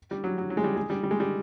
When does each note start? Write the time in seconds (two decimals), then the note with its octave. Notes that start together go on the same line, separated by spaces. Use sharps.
0.11 G3
0.24 F#3
0.38 F#3
0.50 F#3
0.57 G#3
0.64 G3
0.76 G#3
0.90 G3
1.03 G3
1.11 G#3
1.20 G3